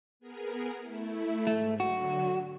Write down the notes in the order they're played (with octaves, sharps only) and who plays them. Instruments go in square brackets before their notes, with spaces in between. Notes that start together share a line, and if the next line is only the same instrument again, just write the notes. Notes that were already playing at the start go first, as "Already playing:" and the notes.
[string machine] B3 G#4 A#4
A3 E4
[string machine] G#2 [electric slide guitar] A3
[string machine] D3 F#3 [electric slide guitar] F#4